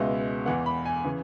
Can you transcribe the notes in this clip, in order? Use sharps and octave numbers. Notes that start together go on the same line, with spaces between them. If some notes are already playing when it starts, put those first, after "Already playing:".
Already playing: C#2 B2 G#3 B3 E5
E2 E3 B3 F#5
B5
G#5
C#3 E3